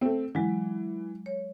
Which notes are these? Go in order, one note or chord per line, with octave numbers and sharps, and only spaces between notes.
A3 C4
E3 F#3 G#3
C#5